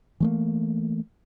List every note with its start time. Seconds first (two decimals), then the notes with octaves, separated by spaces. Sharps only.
0.20 E3 A3 A#3